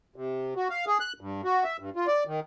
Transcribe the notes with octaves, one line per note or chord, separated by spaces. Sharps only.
C3
F#4
F5
G#4
F#6
G2
F#4
E5
G2
F4
D5
D#3